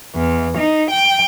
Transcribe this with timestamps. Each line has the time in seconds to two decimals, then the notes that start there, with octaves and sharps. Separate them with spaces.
0.16 E2
0.58 D#4
0.91 G5